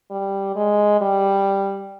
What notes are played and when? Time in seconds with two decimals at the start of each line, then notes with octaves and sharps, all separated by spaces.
0.11 G3
0.56 G#3
1.01 G3